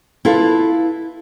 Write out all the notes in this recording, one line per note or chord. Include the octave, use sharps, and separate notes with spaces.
E4 F4 A4 B4 F5